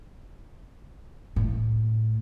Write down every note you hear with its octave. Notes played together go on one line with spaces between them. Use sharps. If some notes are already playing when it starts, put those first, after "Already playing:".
A2